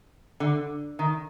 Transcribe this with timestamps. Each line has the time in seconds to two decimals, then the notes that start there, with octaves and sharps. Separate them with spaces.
0.40 D3
0.99 D#3